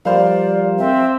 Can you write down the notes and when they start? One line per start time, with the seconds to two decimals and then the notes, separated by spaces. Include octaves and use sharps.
0.05 F3 G3 A#4 C5 D5 F5
0.78 C4 E5